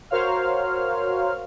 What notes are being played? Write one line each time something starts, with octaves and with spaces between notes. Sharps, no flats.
F#4 A#4 C5 C#5 F5 F6